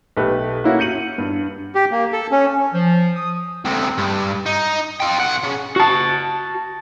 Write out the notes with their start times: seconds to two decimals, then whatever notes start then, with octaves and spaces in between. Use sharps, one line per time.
0.17 B1 A3 G4 B4
0.64 A#3 C#4 E4 F#4
0.79 G6 C#7 D#7 F#7
1.18 G2
1.75 G4
1.91 A#3
2.13 A4
2.31 C#4
2.73 F3
3.16 D#6
3.65 D2 C3
3.98 G2
4.46 D#4
5.00 F4 G5
5.18 B1 F#5
5.44 C#3
5.76 F#4 A5